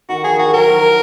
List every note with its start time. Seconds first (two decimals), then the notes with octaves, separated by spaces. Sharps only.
0.09 D#3 F#4
0.24 F3 G#4
0.39 D#3 F#4
0.53 F#3 A#4
0.68 F3